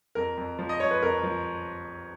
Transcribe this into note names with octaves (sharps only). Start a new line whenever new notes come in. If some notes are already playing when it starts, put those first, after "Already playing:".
F2 A#4
F2
F3
D#5
F3 C#5
B4
F2 A#4
F3